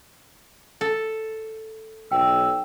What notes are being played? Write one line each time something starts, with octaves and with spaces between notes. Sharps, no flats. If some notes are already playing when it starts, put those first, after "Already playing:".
A4
B1 G5 E6